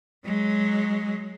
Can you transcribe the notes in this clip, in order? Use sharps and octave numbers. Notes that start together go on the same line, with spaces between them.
F#3 G#3